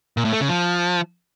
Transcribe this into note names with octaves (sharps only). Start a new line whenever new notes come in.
A#2
A2
A3
C#3
F3